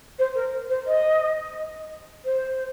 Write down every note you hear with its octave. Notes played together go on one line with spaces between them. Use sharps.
C5
A#4
C5
D#5
C5